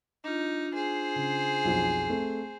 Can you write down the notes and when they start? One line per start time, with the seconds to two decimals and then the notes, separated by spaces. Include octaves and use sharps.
0.24 D4 D#4 F4
0.74 G#4 C5
1.16 C#3
1.65 B1 F2
2.10 A3 C4